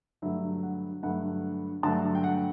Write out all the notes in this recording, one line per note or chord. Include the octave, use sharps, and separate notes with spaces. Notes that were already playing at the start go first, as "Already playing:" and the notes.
G2 D3 F#3 A3 E5
F#5
G2 D3 F#3 A3 F#5
G2 D3 F#3 A3 A5
G5
F#5